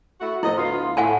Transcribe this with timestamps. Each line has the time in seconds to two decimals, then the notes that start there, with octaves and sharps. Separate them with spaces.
0.21 A3 E4 F#4
0.43 A2 F3 E4 D#5
0.57 D2 B3 F4
0.97 A2 F#5 G#5 A5